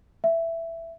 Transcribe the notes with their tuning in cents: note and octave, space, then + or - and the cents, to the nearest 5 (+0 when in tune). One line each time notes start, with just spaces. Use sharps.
E5 +10